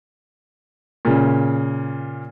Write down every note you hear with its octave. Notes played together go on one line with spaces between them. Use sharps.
A#2 C#3